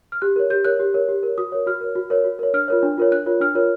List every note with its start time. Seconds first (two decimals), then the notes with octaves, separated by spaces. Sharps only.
0.12 F6
0.22 G4 F#6
0.36 A#4 C#5
0.50 G4 G6
0.65 A#4 C#5 F#6
0.80 G4
0.94 A#4 C#5
1.08 G4
1.23 A#4 C#5
1.38 F#4 D#6
1.52 A#4 C#5
1.66 F#4 F6
1.81 A#4 C#5
1.95 F#4
2.10 A#4 C#5
2.24 F#4
2.39 A#4 C#5
2.53 D4 F6
2.68 F4 A#4 C#5
2.82 D4
2.98 F4 A#4 C#5
3.12 D4 F#6
3.26 F4 A#4 C#5
3.40 D4 F6
3.55 F4 A#4 C#5